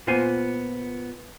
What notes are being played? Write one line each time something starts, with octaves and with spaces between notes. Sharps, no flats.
A#2 B3 F4 C5 G#5